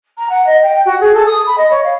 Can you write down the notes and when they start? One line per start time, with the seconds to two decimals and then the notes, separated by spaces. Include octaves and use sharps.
0.18 A#5
0.30 F#5
0.46 D#5
0.62 G5
0.85 F#4
1.01 G#4
1.14 A4
1.26 D#6
1.46 B5
1.58 D#5
1.70 C#5
1.84 F5